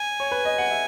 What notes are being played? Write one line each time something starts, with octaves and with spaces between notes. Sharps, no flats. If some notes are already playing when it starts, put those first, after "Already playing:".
Already playing: G#5
C#5
B4
D#5
F#5
E5